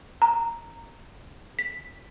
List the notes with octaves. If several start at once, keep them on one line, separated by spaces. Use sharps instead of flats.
A#5
B6